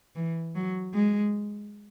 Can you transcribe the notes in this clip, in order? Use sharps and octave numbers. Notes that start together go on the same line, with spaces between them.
E3
F#3
G#3